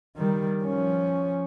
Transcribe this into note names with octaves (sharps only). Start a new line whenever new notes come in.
D#3 G3
F3 C#4